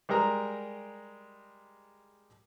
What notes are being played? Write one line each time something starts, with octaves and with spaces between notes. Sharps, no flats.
G3 G#3 G4 A#4 A#5